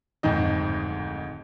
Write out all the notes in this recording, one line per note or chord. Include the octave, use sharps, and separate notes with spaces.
D1 F2 G#2 D#3 D#5